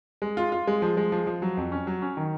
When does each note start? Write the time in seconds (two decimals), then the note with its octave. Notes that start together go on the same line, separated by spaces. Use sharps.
0.22 G#3
0.37 F4
0.52 F4
0.67 G#3
0.82 F3
0.97 G#3
1.12 F3
1.27 F3
1.42 F#3
1.57 F2
1.72 C#4
1.87 F#3
2.02 C#4
2.17 D#3